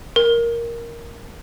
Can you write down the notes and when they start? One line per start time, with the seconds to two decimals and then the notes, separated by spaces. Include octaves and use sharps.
0.16 A#4